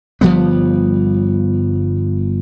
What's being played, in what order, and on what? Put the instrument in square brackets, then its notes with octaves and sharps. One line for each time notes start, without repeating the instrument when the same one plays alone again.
[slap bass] G1 F3 G3 B3